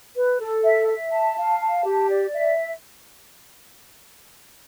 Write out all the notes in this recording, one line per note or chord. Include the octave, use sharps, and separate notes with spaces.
B4
A4
E5
E5
A5
F5
A5
G4
D5
E5